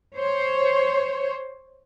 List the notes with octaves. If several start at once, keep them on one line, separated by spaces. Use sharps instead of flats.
C5 C#5